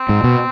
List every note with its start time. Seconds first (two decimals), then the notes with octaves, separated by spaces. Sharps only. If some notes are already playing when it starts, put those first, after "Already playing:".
Already playing: C4
0.09 G#2
0.24 B2